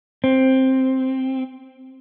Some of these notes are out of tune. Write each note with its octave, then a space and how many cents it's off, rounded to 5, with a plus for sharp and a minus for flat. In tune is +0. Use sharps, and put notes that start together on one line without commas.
C4 +5